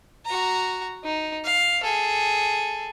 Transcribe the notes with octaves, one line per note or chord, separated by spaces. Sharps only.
F#4 A#5
D#4
F5
G#4 A4